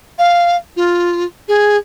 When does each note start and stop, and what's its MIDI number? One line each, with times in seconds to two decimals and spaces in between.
0.18 0.57 77
0.76 1.24 65
1.48 1.77 68